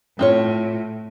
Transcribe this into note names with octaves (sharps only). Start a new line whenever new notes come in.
A2 C4 F4 C#5